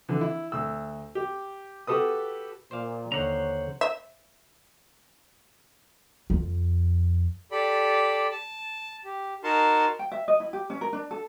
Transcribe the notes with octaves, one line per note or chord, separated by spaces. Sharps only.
D3 E3
E4
D2 E6
G4
F#4 G4 A4 B4 D#6
A#2 C5 D5 F5
D#2 D3 C5 C#5 F#5 A#5
E5
F2
G4 A4 D5 B5
A5
G4
D#4 F#4 A#4 A5 C6
G5
E5
D#5
E4
G4
C#4
A#4
D4
A4